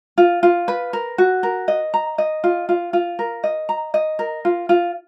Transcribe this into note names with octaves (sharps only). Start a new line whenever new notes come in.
F4
F4
B4
A#4
F#4
A#4
D#5
A#5
D#5
F4
F4
F4
A#4
D#5
A#5
D#5
A#4
F4
F4